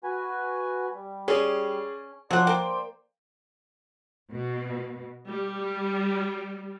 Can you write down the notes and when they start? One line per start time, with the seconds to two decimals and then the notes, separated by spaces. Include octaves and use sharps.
0.04 F#4 B4 G#5
0.95 G3
1.28 C#4 G#4 D5
2.31 F3 F#3 C5 D5 F#5
2.47 A#3 G5
4.31 B2
5.28 G3